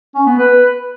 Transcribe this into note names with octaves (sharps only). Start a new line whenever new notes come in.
C#4
B3
B4